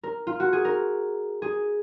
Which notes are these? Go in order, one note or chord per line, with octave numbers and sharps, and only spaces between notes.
A#4
F4
F#4
G#4
A#4
G#4